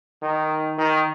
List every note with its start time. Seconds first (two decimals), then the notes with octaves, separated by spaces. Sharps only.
0.23 D#3
0.78 D#3